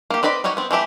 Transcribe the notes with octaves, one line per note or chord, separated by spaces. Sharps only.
A#3 G4
C4 B4 D5 D#5 B5
G3 D#4 F#4 C#5 F#5
B3 C4
E3 A3 G4 E5